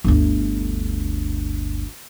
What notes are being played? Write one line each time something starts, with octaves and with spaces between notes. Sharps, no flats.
G1 D2